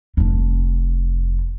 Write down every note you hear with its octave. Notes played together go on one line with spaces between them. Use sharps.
F1 D4